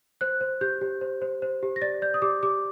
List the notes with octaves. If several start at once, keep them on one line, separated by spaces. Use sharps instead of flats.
C5 F#6
C5
G4 G6
G4
C5
C5
C5
G4
A#6
D5 A6
D5 G6
D#6
G4 D6
G4 D6